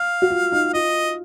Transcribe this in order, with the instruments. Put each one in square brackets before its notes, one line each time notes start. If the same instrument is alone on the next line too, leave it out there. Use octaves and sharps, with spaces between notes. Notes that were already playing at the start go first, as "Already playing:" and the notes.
Already playing: [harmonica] F5
[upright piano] F#4
F4
D#4
[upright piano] F4 [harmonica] D#5